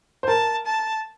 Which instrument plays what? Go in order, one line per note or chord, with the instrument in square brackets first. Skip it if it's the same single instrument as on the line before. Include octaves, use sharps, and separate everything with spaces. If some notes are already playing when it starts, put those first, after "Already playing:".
[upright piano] C5
[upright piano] A#4 [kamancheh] A5
[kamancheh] A5